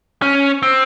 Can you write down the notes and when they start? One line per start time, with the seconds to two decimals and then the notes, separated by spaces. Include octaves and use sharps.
0.22 C#4
0.63 C4